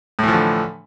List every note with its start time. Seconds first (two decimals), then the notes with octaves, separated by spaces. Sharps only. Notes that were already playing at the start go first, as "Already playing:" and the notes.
0.19 A2
0.23 E3
0.28 F3
0.33 D3